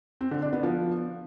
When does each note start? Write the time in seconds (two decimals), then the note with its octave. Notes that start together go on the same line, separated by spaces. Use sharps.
0.21 C4
0.31 D3
0.42 D4
0.53 B3
0.63 F3